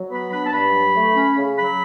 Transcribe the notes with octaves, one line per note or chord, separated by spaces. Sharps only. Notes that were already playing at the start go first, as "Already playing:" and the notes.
Already playing: F#3
B3 B5
D4 B5
A5
G2 B5
F#3
A3
C#4
C#3
F#3 B5